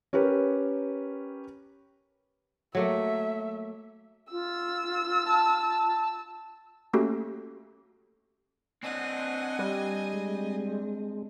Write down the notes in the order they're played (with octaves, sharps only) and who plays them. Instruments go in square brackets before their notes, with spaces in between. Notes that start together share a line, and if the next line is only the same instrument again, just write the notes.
[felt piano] C#4 G4 A#4 B4
[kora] F#3 A3 A#3 [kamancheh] E5
[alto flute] F4 [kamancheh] E6
[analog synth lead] A5
[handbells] A3 A#3 C#4 F#4 G4 A4
[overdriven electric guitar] C4 D4 [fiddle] D#5 G#5 [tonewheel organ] F#5
[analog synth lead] G3
[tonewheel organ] G#3